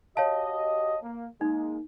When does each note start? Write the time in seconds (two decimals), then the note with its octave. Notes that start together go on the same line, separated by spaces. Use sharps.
0.17 F#4 G4 C#5 D#5 F5 A5
1.03 A#3
1.41 G#3 A#3 D#4